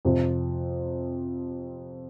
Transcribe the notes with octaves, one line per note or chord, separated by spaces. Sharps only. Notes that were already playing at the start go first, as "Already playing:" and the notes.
F2 C3 F3 C4